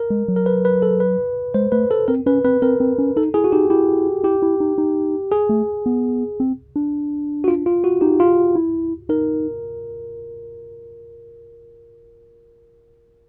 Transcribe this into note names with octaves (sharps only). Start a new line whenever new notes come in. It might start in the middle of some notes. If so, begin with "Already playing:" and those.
Already playing: A#4
G#3
F#3
A#4
B4
B4
A4
B4
G#3 C5
A3 B4
A4
C4 A#4
C#4 B4
C4 B4
C4 A#4
C4
C#4
D#4 A4
E4 G#4
F#4
D#4 G4
E4 G4
E4 G4
E4
D#4
D#4
G#4
A3
B3
C4
D4
F#4
F4
F4
F#4
D#4 G4
F4
E4
D#4 A#4